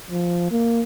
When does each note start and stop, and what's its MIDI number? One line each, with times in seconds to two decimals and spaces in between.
0.11 0.47 53
0.51 0.83 58